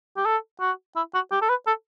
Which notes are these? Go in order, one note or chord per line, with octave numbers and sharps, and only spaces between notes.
G4
A4
F#4
E4
F#4
G4
A4
B4
A4